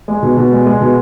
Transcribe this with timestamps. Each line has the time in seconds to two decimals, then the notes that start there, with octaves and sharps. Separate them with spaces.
0.08 G#3
0.22 B2
0.37 B2
0.52 G#3
0.66 G#3
0.81 B2